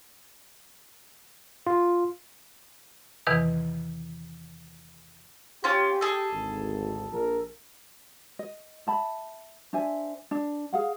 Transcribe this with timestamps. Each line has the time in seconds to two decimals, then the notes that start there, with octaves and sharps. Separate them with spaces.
1.67 F4
3.27 E2 C3 D#3 E3 B4 D#6
5.64 C#4 F4 G4
6.01 G#4 A4
6.32 G#1 D2
7.11 A#1 A#4
8.39 D#5
8.87 E5 A5 B5
9.73 D4 C5 E5 G#5
10.31 D4
10.73 G#4 F5 F#5